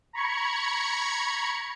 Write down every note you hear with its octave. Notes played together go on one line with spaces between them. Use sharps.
A#5 B5 C#6 G#6 C#7